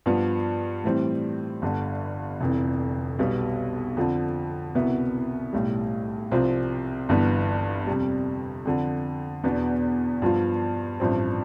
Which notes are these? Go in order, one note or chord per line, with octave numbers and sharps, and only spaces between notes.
G2 F3 B3 F4
A2 E3 G3 C4
G1 G2 D3
F1 F2 E3
B1 B2 G3 B3
F2 D3 F3
C2 B2 B3 E4
B1 A2 G3
C2 C3 F3 C4 F4
G1 G2 E3 B3
F2 C3 G3
F2 D3 F3
E2 B2 B3 D4
G2 F3 B3 F4
A1 G2 F3 C4